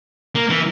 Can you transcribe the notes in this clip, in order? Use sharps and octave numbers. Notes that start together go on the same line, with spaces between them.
A#3
E3